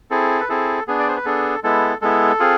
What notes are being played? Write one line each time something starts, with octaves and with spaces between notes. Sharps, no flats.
C4 E4 G#4 A4
B4
C4 E4 G#4 A4
B3 D4 G#4
D5
C5
B4
B3 D4 G#4 A4
G#3 B3 E4 A4
G#3 B3 E4 A4
C4 F4 G#4